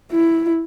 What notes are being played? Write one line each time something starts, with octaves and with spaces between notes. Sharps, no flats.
E4